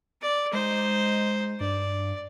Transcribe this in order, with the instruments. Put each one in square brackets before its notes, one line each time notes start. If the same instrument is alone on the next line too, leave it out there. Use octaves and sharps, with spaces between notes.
[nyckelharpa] D5
[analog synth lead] G#3 [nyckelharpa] D#4 C5
[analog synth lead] G2 [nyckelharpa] D5